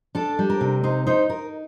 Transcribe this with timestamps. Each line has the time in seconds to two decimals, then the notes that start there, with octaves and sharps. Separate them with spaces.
0.15 D4 A4
0.39 G3
0.50 A#4
0.61 C3
0.83 D#4 C5
1.07 D#4 C5
1.29 D#4 A#4